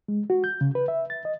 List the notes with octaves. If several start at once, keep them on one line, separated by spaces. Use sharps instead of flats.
G#3
F#4
G6
C#3
B4
E5
A6
D#5